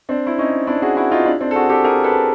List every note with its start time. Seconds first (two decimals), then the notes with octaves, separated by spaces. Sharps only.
0.09 C4 D4
0.27 E4
0.39 C#4 D#4
0.67 D4 E4
0.82 F#4 G#4
0.97 E4 F#4
1.11 D#4 F4
1.26 D4 E4
1.41 C4 D4
1.51 A4
1.56 F#4 G#4
1.69 G4 A4
1.84 G#4 A#4
2.04 A4 B4